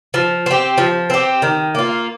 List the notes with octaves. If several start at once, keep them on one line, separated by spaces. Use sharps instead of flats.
F3
C4 G4
F3
C4 G4
D#3
A#3 F4